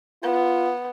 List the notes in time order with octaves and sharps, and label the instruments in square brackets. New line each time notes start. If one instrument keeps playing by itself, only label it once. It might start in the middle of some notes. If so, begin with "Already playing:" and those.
[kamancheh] B3 [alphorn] F4